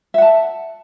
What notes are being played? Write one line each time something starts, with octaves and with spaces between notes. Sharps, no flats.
E5 F#5 A5